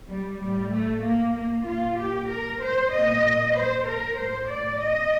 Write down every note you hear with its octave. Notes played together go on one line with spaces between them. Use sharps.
G3
A2 G3
A3
A#3
A#3
A#2 F4
G4
A#4
C5
A#2 D#5
C5
A#4
A2 C5
D5
D#5